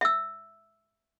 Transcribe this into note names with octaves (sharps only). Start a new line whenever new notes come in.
E5 E6